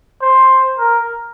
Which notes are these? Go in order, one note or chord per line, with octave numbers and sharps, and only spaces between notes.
C5
A#4